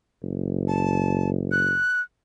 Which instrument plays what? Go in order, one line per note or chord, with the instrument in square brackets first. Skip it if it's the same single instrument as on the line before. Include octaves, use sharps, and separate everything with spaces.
[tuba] F#1
[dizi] A5
F#6